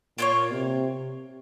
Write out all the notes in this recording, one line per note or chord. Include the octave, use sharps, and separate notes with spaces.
A#2 A#3 F4 A4 C#5
C3